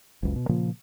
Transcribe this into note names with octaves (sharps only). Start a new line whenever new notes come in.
F#1 C#2
B2
A#2 C#3 F3 A#3